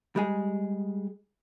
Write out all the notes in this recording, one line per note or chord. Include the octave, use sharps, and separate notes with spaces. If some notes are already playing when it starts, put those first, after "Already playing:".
G3 G#3 G#4